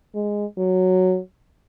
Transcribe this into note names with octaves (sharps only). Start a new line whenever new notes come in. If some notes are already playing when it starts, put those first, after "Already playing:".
G#3
F#3